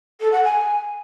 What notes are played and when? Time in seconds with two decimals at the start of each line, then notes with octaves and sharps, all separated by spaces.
0.20 A4
0.32 F#5
0.44 G#5